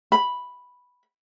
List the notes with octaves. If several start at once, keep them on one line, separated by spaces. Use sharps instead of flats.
B5